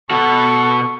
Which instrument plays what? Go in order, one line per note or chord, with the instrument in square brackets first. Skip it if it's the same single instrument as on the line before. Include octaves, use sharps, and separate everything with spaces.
[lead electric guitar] B2 F#4 [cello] A4 [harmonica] C#6